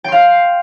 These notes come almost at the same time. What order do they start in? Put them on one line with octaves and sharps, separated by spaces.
G5 C6 F5